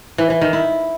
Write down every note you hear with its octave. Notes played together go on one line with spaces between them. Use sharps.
E3
E3
D#3
E4